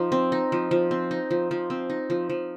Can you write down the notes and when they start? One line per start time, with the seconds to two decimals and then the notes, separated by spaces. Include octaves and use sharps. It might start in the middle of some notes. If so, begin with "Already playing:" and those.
Already playing: F3 D#4
0.12 C4
0.32 D#4
0.52 F3
0.71 F3
0.91 C4
1.11 D#4
1.31 F3
1.51 F3
1.70 C4
1.90 D#4
2.10 F3
2.30 F3